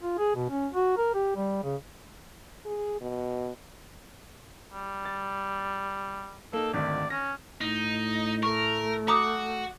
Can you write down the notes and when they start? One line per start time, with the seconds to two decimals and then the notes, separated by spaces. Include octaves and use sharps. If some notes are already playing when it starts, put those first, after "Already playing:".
0.02 F4
0.18 G#4
0.35 B2
0.50 C#4
0.73 F#4
0.97 A#4
1.14 G4
1.36 G3
1.63 C#3
2.65 G#4
3.01 B2
4.73 G3
5.05 A6
6.53 A#3 D#4 A4
6.74 G#1 D2 D#3 D5
7.10 C#4 A#6
7.61 A2 D#4
8.43 A3 A#4 C#6
9.08 F#4 A#5 D6 D#6